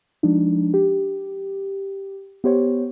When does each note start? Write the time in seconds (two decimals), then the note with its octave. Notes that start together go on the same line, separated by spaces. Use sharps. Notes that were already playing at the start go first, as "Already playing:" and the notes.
0.23 F3 G#3 D4 D#4
0.74 G4
2.44 B3 G4 C5 C#5